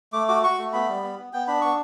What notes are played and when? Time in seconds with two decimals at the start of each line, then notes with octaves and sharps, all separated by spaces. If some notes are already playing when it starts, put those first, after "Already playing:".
0.13 A3 D6
0.28 F#4 D6
0.43 F#4 C#6
0.59 A3
0.73 B3 B5
0.88 G3
1.03 B3
1.18 B3
1.33 B3 G5
1.47 D4 B5
1.61 B3 C#6